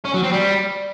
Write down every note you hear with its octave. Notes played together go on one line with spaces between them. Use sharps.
C#4
F#3
C4
G3